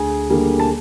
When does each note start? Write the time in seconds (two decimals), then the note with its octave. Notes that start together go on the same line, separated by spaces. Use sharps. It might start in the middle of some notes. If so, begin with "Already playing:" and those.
Already playing: D2 G#4 G#5
0.30 D3 G3 A#3
0.60 A5